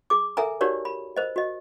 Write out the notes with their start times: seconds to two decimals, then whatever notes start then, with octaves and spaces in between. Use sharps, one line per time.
0.10 G#4 D6
0.37 A4 A#4 E5 G#5 A#5
0.61 D#4 F#4 G4 A#4 C#5 D5
0.85 B5
1.17 A#4 C5 D#5
1.36 F#4 D#5